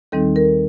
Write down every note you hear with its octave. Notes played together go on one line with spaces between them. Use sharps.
D#2 D#3 G3 C4 D#4 A4
A#4